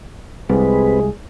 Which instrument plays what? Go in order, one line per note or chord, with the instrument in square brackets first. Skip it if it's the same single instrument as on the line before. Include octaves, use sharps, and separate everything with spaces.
[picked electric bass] C2 [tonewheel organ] G3 C4 B4 [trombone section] G#3 G#4